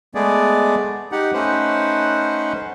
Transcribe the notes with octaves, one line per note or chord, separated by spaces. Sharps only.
G#3 A3 B3 G#4 D5
D#4 G4 F#5
A3 C#4 D#4 B4 C5 F#5